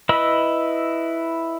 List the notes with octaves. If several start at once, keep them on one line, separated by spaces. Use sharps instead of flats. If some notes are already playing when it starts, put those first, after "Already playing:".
E4 B4 D#5 B5 E6